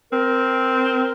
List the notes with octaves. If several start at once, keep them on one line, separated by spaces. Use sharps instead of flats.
C4 A#4